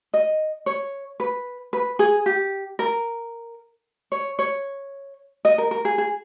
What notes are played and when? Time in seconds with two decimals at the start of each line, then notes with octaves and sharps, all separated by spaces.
0.14 D#5
0.66 C#5
1.20 B4
1.73 B4
1.99 G#4
2.26 G4
2.79 A#4
4.12 C#5
4.39 C#5
5.45 D#5
5.58 A#4
5.71 A#4
5.85 G#4
5.98 G#4